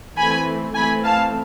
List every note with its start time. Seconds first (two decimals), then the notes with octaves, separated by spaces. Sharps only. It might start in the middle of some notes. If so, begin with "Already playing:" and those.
0.17 E3 A3 C4 G#5 B5
0.75 E3 A3 C4 G#5 B5
1.04 F5 A5